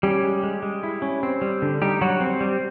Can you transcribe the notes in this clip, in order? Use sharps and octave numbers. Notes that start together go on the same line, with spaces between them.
G3 C#4 G4
G#3
G#3
G#3
E4
C#4
C4
G3
D3
G3 D#4 G4
F#3 G3 F#4
C4
G3